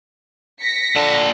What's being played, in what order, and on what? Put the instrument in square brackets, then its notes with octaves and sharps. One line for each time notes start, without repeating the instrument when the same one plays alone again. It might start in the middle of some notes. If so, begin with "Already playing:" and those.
[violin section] A#6 B6 C#7
[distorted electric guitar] A#2 A5 [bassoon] D3